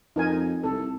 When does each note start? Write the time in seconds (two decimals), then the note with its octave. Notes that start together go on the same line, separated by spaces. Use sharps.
0.16 F2 D#4 A#4 G#5
0.63 C2 A4